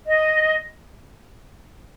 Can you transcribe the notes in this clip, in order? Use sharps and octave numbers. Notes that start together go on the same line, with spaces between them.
D#5